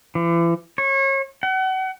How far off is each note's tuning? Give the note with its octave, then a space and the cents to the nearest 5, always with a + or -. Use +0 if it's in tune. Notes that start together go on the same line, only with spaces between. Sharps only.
E3 +40
C#5 -30
F#5 +35